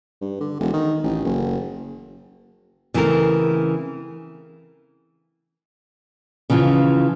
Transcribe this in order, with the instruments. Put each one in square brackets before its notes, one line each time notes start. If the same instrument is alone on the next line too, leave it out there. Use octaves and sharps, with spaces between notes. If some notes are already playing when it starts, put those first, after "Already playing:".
[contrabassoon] G2
D3
E1
D#3
A1
F#1
[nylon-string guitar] C#3 E3 A3 C4 A#4
C#3 E3 F3 F4